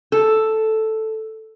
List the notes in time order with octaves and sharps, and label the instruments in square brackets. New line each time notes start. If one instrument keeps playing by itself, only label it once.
[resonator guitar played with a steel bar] A4